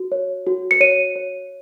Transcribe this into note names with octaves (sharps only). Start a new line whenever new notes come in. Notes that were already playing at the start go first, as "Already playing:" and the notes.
Already playing: F#4
C#5
F#4
C#7
C#5 D#7
C#5